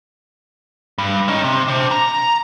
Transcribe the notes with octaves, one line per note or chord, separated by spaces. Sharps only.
G2
C#4 D#4
C3
D4 C5
A#5